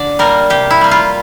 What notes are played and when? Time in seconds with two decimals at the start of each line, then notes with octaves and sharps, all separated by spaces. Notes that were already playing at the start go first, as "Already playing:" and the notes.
Already playing: D3 D5
0.19 G3 A#3 A#4
0.50 C3 G4
0.71 E4
0.81 G3 A#3
0.91 F4